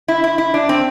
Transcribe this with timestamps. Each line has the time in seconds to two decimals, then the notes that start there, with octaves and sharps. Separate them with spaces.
0.08 E4
0.24 E4
0.38 E4
0.54 D4
0.69 C4